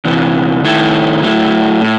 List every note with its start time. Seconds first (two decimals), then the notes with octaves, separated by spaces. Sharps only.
0.05 E2 C3 E3
0.64 D#3 A3 E4 A4
1.22 F#3 A3 E4
1.81 A2